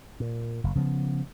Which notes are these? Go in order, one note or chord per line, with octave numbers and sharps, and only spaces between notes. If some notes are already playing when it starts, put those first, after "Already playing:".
A#2
F#1
C#3 F3 B3